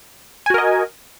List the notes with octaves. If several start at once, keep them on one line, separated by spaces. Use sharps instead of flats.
F#4 A#4 D#5 G#5